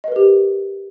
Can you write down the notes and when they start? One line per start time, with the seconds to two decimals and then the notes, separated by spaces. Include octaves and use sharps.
0.04 D#5
0.08 B4
0.12 A#4
0.16 G4